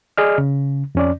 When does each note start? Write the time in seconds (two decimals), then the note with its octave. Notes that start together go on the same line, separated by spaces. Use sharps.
0.17 G#4 D5 D#5 F6
0.38 C#3
0.95 F2 C#4 D5